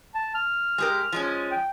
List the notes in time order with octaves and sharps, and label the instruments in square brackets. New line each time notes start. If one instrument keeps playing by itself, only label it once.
[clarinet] A5
F6
[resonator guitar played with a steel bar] G#3 G4 A#4
F3 G#3 C#4
[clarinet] G5